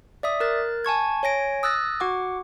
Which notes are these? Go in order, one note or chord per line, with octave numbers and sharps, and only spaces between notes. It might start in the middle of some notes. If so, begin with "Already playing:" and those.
D5 E5 D#6
A#4 F#6 A6
G#5 A5 C#6 G#6
C#5 G#5 A#6 D7
D#6 E6 F#6 A6 A#6
F#4 F#5 D6